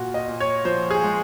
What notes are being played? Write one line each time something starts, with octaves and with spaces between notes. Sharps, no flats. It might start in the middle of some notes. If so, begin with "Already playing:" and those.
Already playing: A#2 F#4
D#5
A#2
C#5
F3 C5
G#4
G#3